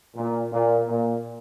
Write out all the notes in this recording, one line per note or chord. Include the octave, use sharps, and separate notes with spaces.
A#2
A#2
A#2